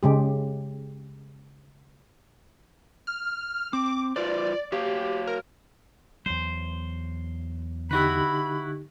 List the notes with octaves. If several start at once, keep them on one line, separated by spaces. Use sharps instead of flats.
C#3 G#3 G4
F6
C4 D6
F4 B4 C5 D5
F#4 G4 C#5 F5
A#4
E2 F#3 C5
D3 D#4 E4 F#4 G4 B4 B5